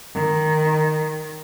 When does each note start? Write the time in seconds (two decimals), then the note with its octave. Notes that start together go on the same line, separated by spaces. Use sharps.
0.13 D#3